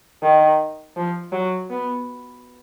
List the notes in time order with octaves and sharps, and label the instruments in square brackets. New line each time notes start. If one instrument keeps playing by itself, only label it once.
[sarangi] D#3
F3
F#3
B3